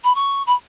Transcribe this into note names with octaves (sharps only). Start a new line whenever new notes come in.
B5
C#6
B5